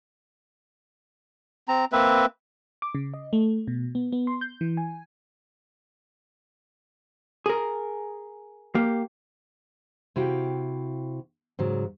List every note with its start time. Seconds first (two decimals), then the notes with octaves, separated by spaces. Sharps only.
1.68 C4 A#5
1.92 A#3 C4 B4 E5
2.82 D6
2.95 C#3
3.14 D#5
3.33 A3
3.68 B2
3.95 B3
4.12 B3
4.27 C6
4.41 G6
4.61 E3
4.77 G#5
7.46 G#4 A#4
8.75 A#3 G4
10.16 C3 E4 F#4 F5 G5
11.59 G#2 C#3 F#3